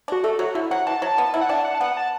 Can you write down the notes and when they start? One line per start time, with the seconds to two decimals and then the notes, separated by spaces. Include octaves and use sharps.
0.08 D4
0.12 F#4
0.24 A3 A4
0.39 F#3 F#4
0.55 D3 E4
0.71 F#3 F#5
0.87 E3 A5
1.02 F#3
1.18 B3
1.34 E4
1.41 F#5
1.49 D4 A5
1.65 F#5
1.75 A5
1.80 B3 F#5
1.97 A5